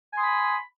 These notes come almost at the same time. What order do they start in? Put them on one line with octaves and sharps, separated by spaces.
G#5 C6 D#6 B5